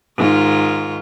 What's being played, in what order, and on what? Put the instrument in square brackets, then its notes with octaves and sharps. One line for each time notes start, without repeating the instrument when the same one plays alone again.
[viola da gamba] G#2 D#3 F4